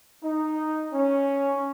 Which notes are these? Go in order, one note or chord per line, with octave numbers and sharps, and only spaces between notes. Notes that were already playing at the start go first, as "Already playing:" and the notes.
D#4
C#4